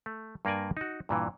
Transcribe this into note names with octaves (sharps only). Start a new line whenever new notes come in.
A3
G2 A#3 A#4 D5 G#5
D#4 F#4
G2 A#2 E3